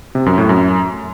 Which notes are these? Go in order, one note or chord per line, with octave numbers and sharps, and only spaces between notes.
C3
F#2
A2
F#2